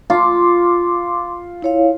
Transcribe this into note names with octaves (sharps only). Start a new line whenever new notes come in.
F4 C6 D6
E4 C#5 F5